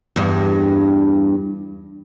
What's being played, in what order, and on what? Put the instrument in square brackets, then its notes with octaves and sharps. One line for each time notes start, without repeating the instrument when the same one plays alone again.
[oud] E2 G2